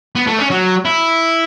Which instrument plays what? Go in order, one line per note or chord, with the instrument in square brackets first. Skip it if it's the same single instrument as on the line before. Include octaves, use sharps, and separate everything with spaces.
[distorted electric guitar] B3
A3
C#4
F#3
E4